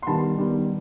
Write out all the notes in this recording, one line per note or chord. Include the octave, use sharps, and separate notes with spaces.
C6
D#3 G3 B3 A5 B5
D#3 G3 B3